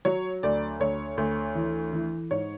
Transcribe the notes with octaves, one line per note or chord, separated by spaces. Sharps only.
F#3 C#5
D2 D5
D2 C#5
D2
E3
E3
G#2 C#5